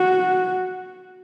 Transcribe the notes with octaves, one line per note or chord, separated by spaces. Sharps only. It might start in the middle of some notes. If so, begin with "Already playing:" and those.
Already playing: F#4